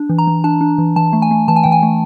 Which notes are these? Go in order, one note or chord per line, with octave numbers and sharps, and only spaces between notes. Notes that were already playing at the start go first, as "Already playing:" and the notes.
Already playing: D4
E3
A#5
E3
D4 A5
D4
E3
E3 A5
A3
G#5
A3
E3 A5
G#5
E3 G5
G#5
A3